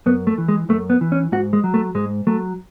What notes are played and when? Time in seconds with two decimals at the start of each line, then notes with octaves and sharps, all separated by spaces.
0.06 F#2 B3
0.27 A3
0.38 E3
0.48 G#3
0.69 F#2 A3
0.90 B3
1.01 E3
1.12 C#4
1.32 G#2 F#4
1.53 G#3
1.64 F#3
1.74 A3
1.95 G#2 G#3
2.27 F#3 A3